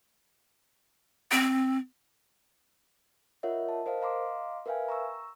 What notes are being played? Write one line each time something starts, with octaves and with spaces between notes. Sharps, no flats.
C4
F4 A#4 C#5 D#5 E5 F#5
A5
A#4 C5 D#5 F5
D#5 F5 A#5 C6 D6
A#4 B4 E5 F5 G5 G#5
A#5 C#6 E6